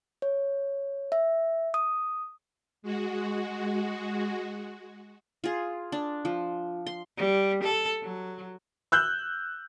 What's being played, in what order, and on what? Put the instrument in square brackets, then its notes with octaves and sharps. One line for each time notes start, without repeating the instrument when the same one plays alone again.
[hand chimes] C#5
E5
D#6
[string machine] G#3 F#4
[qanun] F4 G#4
D4
F3
C6
[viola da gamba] G3
A4
F#3
[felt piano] E6 F#6 G6